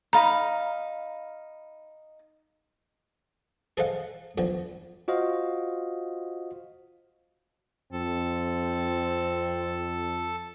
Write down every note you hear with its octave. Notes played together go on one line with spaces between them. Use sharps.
D#4 F5 A#5 B5
G#4 A4 C5 D#5 F5 F#5
E2 D3 F3
F4 F#4 C5 D#5 F5
F2 C4 A4